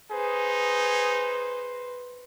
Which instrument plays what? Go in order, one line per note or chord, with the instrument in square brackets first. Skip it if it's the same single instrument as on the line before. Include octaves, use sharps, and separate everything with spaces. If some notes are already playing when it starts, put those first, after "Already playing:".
[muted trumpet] D#4 [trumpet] G#4 [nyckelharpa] B4 C5